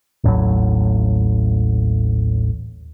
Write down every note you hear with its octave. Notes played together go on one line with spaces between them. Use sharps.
A1 D#2 A2 F#3